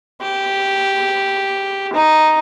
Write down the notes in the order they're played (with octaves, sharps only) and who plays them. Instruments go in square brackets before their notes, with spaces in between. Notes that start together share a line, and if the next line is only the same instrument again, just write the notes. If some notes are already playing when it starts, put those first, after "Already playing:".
[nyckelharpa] G4
D#4